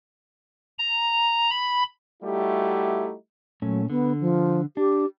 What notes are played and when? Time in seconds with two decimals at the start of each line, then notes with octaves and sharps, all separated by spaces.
0.79 A#5
1.50 B5
2.23 G3 A3 D#4 E4 F#4 G4
3.62 A#2 F#3 A3 C#4
3.90 D3 B3
4.21 F3
4.77 D4 G4